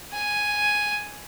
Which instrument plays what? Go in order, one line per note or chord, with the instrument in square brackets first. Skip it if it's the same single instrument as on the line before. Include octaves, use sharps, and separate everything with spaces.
[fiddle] G#5